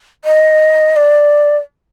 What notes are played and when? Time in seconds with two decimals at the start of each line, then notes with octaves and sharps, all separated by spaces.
0.24 D#5
0.96 D5